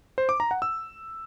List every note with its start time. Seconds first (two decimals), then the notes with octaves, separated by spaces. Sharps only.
0.18 C5
0.29 D6
0.40 A#5
0.51 F#5
0.62 E6